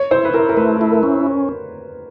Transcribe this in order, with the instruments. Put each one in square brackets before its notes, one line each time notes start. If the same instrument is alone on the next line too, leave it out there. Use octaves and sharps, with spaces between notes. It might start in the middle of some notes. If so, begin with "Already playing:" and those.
Already playing: [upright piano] C#5
[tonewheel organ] E4 [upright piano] C5
[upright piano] B4
[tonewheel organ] E4 [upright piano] A#4
[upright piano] A#4
[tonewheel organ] A3 [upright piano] B4
[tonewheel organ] E4
[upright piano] A#4
[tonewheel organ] C#4